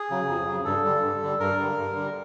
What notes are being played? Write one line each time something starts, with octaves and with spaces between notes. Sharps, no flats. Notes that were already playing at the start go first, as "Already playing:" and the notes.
Already playing: G#4
C#3 F#3
F2
C#3 F#3
G2 A4
D3 G3
G2
D3 G3
G2 A#4
D3 G3
G2
D3 G3